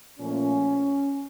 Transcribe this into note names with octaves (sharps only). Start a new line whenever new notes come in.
A#2 F3 A3 C#4